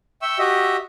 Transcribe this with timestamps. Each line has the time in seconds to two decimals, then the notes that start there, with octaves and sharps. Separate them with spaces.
0.22 E5 G5 C#6 E6
0.39 F#4 G4 D#5 E5